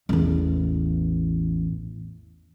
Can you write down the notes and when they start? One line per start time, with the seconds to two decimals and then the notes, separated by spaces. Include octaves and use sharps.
0.09 A1 E2